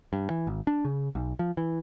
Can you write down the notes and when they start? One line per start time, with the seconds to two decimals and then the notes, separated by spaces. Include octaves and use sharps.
0.13 G2
0.30 E3
0.47 G#1
0.67 D4
0.85 C#3
1.15 B1
1.39 F3
1.57 E3